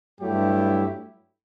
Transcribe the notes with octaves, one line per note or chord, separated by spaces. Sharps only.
G2 F#3 A3 E4 G4